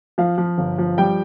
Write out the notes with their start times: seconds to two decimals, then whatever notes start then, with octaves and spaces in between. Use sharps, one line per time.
0.18 F3 F5
0.38 F3
0.58 G1
0.79 F3
0.98 G3 G5